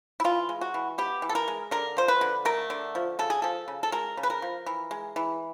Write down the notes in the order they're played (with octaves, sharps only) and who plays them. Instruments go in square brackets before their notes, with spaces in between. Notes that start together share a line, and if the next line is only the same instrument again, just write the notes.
[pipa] E4
E3 F4
G#3
F#4
E3
B3 G4
E3
A4
A#4
G#3
D3 A#4
F3 C5
B4
D3
A3 A#4
D3
F3
C#3 A4
G#4
F3 A4
C#3
A4
G#3 A#4
C#3
B4
A#4
F3
E3
G#3
E3